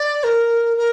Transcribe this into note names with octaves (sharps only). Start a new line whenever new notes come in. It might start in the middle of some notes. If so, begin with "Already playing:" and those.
Already playing: D5
A#4
A#4